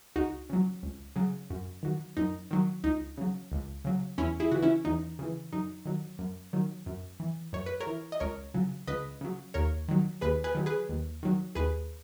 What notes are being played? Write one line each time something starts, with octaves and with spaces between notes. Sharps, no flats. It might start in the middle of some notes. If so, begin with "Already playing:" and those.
C#2 D#4 F#4
C#3 F#3
C#2
C#3 F#3
F#2
D#3 F#3
F#2 D#4
D#3 F#3
C#2 D#4
C#3 F#3
C#2
C#3 F#3
E2 C#4 E4
E4 G#4
C#3 E3 F#4
C#4 E4
E2 D#4
C#3 E3
F#2 D#4
D#3 F#3
F#2
D#3 F#3
F#2
E3
F#2 C#5
B4
A#4 C#5
E3
D#5
C#2 A#4 C#5
C#3 F#3
C#2 B4 D#5
C#3 F#3
D#2 A#4 C#5
D#3 F#3
D#2 G#4 B4
G#4 B4
D#3 F#3
G#4 B4
D#2
D#3 F#3
D#2 G#4 B4